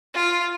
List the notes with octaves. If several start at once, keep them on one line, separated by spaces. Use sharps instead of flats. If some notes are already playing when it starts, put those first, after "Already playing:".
F4